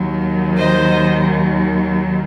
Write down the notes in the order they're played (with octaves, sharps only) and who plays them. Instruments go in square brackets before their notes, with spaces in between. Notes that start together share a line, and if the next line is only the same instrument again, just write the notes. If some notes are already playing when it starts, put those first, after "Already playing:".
Already playing: [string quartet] D#2 D#3 F#3
C5 D#5